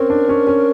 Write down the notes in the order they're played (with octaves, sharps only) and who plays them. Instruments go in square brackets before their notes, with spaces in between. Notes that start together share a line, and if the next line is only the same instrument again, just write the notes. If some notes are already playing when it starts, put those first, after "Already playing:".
Already playing: [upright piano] C4 C#4 [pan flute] A#4
[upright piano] D4
C#4
C#4